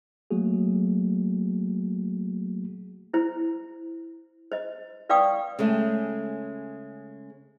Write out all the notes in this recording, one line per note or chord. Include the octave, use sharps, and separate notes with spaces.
F#3 A3 A#3 F#4 G#4
E4 C5
C5 D#5
B4 D5 F5 G5 C#6 D#6
C#3 G#3 A3 C#4